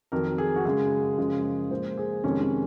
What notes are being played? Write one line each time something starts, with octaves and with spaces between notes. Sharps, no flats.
F2 D#3 F#3 A#4
G#4
F#4
F#2 C#3 G#3 G#4
F#2 C#3 F3 G#3
A#2 F3 G#3 C5
G#4
F2 C3 D#3 G#3 C#4
C#4